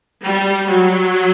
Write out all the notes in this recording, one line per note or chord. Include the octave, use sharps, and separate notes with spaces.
G3
F#3